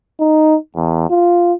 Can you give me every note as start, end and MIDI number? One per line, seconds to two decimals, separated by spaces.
0.20 0.56 63
0.76 1.09 40
1.10 1.53 65